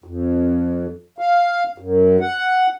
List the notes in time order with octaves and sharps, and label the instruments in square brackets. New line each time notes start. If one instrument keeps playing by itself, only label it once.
[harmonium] F2
F5
F#2
F#5